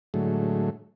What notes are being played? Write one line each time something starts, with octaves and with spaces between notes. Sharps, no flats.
A2 D3 F#3 G#3 A3